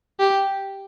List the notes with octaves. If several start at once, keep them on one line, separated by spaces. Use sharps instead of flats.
G4